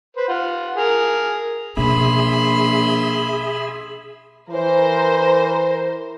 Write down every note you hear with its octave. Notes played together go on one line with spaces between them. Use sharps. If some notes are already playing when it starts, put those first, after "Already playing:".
B4 C5
F4 F#5
G#4 A#4
A#1 B2 C#4 G#4 E5 B5 C6
E3 A#4 C5